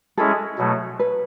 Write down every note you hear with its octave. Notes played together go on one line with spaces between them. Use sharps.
G#3 C#4 E4 G#4 A4
B2 F#3 A3
B4